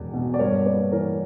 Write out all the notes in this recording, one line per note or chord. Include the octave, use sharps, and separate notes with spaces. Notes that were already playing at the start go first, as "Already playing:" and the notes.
Already playing: E1 E2
B2
D5
G2 A#4 C#5
A#3 B4 D5
E3 A#4 C#5